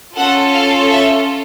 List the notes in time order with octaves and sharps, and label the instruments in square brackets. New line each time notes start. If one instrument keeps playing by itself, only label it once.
[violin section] C#4 F4 A4 F#5
F5
E5